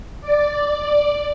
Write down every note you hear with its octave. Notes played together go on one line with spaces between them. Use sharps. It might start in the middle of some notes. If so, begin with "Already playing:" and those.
D5